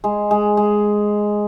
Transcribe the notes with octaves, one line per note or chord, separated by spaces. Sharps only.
G#3
G#3
G#3